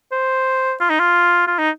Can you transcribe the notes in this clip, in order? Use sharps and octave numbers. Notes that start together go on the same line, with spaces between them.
C5
F4
D#4
F4
F4
D#4